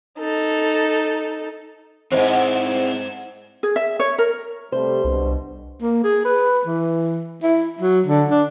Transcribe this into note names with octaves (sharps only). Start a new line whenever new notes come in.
D#4 A4
E2 G#2 C4 E4 C5 D#5
G#4
E5
C#5
A#4
C3 G3 A3 C5
C2 G2 B2
A#3
G#4
B4
E3
E4
F#3
D3
D4